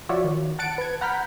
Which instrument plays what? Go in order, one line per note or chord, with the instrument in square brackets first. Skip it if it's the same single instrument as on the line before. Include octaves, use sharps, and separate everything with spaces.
[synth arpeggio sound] F3 F4 F#4 C#5 D5 E5
D#3
F#5 A5 F#6 A6 C#7 D7
B4 G#6
F#5 A#5 B5 F6 G6 B6